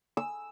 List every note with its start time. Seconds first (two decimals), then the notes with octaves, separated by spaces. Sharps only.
0.17 E6